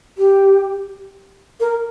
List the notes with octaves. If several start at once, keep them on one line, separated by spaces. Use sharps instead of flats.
G4
A#4